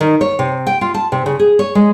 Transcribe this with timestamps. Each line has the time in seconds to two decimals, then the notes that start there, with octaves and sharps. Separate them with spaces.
0.01 D#3
0.21 C#5
0.39 C3
0.67 G5
0.81 F4
0.94 A5
1.12 C3
1.26 C#3
1.39 G#4
1.59 C#5
1.75 G#3